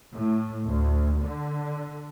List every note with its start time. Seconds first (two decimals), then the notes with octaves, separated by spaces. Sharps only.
0.14 A2
0.65 D2
1.21 D3